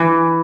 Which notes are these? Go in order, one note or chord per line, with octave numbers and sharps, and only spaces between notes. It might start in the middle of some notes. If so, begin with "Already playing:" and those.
Already playing: E3